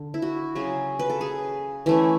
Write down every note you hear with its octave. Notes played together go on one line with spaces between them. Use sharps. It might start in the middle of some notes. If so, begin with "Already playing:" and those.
Already playing: D3
E4
F#4
C#3 F#3 C#4 G#4
B4
A4
G#4
E3 A3 C#4 E4